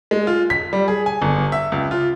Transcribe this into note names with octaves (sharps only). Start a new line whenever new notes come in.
G#3
F4
B6
G3
G#4
G#5
G1
E5
C#2
F4